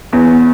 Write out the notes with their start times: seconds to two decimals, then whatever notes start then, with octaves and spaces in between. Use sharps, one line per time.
0.13 E2